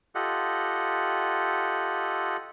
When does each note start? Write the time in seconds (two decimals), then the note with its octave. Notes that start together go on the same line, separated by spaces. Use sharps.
0.15 F4 G4 A4 D#5 F#5